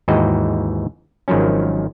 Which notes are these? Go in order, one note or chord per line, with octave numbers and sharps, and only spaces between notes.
D#2 G#2 E3 F#4 D#5 G5
G#1 D#3 F3 F#3 C#4